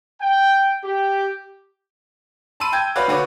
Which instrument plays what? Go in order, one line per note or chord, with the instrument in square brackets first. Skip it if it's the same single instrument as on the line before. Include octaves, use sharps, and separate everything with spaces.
[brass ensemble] G5
G4
[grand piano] A5 B5 C6 E6 D#7
G5 A5 G6 G#6
F#4 B4 C#5 D5 F5 B5
D3 F#4 B4 C#5 D6